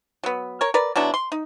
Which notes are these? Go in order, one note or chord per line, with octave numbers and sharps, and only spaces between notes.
F#3 B3
A#4 C#5
A#4 B4 D5
B2 F#3 D4 E4
C6
D#4